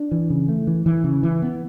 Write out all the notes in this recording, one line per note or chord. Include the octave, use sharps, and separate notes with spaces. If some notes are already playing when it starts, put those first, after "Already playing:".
Already playing: D4
E3
C#3
A3
E3
E3
C#3
E3
B3